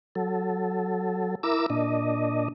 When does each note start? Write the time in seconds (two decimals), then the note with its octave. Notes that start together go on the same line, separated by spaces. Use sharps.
0.15 F#3 A4
1.43 E4 A#4 D6 E6
1.70 A#2 D4 D#5